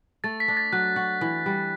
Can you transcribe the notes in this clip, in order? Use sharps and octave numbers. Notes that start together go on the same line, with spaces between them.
A3 A6
B6
D4
A6
F#3 F#6
F#4
E3
G3